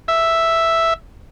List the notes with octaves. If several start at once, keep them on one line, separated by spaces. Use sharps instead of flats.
E5